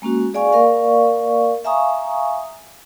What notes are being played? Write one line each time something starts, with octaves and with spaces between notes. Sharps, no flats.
G#3 A#3 C#4 F#4
G#4 D5 F5 G#5 C#6
A#3 A#4 D5 F5 C#6
E5 F5 G#5 A#5 C#6 D#6